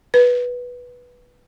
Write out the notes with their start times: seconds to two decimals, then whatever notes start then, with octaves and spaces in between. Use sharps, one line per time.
0.14 B4